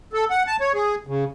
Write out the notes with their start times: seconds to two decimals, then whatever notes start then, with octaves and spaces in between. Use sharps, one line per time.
0.13 A4
0.30 F#5
0.47 A5
0.61 C#5
0.74 G#4
1.07 C#3